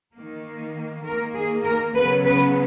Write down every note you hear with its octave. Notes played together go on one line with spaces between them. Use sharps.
D#3 A#3
D#3 A#3 A#4
G#4
A#4
C#3 F#3 B3 B4
B4